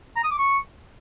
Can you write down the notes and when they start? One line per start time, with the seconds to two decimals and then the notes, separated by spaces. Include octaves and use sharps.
0.17 A#5
0.24 D#6
0.31 D6
0.39 C#6